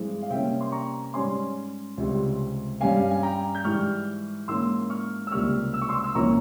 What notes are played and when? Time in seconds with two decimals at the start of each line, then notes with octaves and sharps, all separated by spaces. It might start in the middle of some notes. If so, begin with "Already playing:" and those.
Already playing: G2 E3 G#3 C4
0.23 F5
0.30 C3 G3 A#3 C#4 E5 G5
0.61 C6
0.72 A#5 C#6
1.14 G#2 G3 C#4 G#5 C6
1.98 C#2 C3 G3
2.81 G2 G3 C#4 F5 G#5
3.11 G#5
3.23 G5 A#5
3.55 G6
3.64 G#2 E3 G3 C#6 F6
4.48 G#2 E3 A#3 C#4 C6 E6
4.90 C#6 F6
5.27 E6
5.31 C#2 C3 G3 A#3 C#6 F6
5.74 E6
5.82 C#6
5.89 C6 E6
6.04 E6
6.15 C2 A#2 F3 A#3 C#4 A#5 C#6